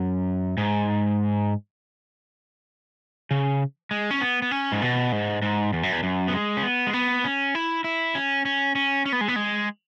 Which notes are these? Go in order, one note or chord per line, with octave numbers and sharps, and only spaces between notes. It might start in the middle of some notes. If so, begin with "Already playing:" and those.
Already playing: F#2
G#2
C#3
G#3
C#4
B3
B3
C#4
G#2
B2
G#2
G#2
E2
F#2
E2
F#2
B3
G#3
C#4
B3
G#3
B3
C#4
E4
E4
C#4
C#4
C#4
C#4
B3
G#3
B3
G#3